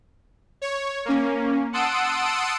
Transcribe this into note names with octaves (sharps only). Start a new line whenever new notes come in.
C#5
A#3 C#4
F#5 A5 C6 D#6 E6 D7